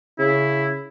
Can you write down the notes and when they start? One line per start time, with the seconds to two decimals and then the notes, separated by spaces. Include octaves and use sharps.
0.19 C#3 E4